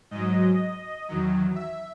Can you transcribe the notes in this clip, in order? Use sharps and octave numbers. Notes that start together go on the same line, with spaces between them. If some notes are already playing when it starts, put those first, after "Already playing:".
G#2 F#3 D#5
E2 D#3 F#3
E5